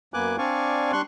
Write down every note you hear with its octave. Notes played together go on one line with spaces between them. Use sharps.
F#2 A#3 B3 G#5 D6 F#6
C4 D4 D5 F5 G#5 C#6
G3 D4 C6 C#6 F#6